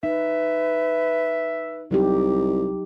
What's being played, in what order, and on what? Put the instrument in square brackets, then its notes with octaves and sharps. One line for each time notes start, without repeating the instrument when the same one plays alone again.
[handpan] D#4 [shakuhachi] B4 [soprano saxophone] E5
[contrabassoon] C2 [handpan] F#3 D#4 G4